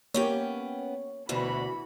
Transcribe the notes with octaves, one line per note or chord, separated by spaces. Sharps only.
A#3 B3 C#4 G4 C#5 G5
D2 B2 E3 D4 F#4 B5